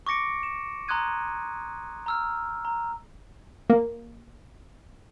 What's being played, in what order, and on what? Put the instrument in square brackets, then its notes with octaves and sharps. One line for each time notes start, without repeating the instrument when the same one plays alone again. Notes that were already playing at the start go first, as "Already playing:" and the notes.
[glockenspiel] C#6 D6 A#6 C#7 D7
E7
A#5 C6 D#6 F#6 G#6 D#7
A#5 E6 F6
A#5
[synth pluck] A#3